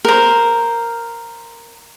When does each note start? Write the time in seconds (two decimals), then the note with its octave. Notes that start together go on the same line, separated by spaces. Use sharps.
0.05 A#4 C5